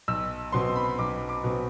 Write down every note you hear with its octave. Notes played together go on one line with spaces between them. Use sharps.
B1 E6
B2 F#3 C4 C6
B5
B1 D6
D6
B2 F#3 C4